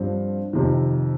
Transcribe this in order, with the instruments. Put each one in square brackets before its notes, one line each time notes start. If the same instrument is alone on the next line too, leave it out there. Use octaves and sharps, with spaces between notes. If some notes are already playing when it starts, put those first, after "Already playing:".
Already playing: [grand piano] G2 F3 C4
F2 C3 D#3